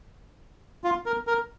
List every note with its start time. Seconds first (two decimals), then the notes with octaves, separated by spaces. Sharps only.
0.84 F4
1.06 A#4
1.27 A#4